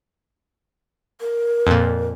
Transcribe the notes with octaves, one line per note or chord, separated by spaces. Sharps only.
A#4
F2 A#2